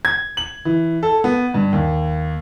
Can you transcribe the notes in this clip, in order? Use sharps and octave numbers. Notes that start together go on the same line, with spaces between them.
G#6
F#7
E3
A4
B3
G2
D#2